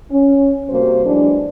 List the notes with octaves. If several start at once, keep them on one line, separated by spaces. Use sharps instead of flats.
C#4
C3 G3 A#3 F#4 C5
E3 F#3 G#3 D4